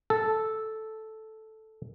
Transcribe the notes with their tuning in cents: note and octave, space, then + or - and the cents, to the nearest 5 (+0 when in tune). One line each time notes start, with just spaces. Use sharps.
A4 -5